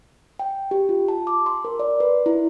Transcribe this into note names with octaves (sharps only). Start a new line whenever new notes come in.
G5
G4
F4
A5
D6
C6
A#4
D5
B4
E4